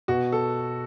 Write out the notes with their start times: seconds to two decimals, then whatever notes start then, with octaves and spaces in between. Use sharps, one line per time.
0.08 B2 F#4
0.32 A4